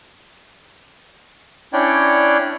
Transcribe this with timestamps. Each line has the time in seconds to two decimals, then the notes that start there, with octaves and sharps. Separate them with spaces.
1.73 C#4 D4 E4 C#5 D5 G5